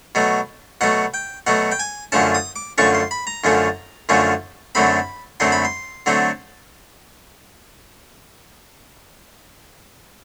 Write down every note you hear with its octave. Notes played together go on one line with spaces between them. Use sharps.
B2 F#3 A3
B2 F#3 A3 F#5
G5
B2 F#3 A3 F#5
G5
G#5
F#2 D3 F3 A3 C#4 A5
D#6
D6
F#2 D3 F3 A3 C#4 C#6
C6
B5
A#5
F#2 D3 F3 A3 C#4
F#2 D3 F3 A3 C#4
F#2 D3 F#3 A3 C4 B5
F#2 D3 F#3 A3 C4 C6
B5
C6
D3 F#3 A3 C4